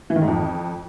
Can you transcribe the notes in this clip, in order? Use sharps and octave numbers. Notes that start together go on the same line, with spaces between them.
E3
D#3
G#2
F2